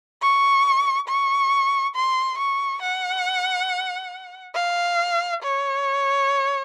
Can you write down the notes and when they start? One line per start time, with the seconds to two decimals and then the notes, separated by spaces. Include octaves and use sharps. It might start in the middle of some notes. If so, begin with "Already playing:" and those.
0.22 C#6
1.08 C#6
1.96 C6
2.39 C#6
2.82 F#5
4.55 F5
5.43 C#5